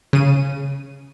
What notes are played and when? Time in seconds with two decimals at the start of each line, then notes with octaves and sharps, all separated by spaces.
0.13 C#3 D#7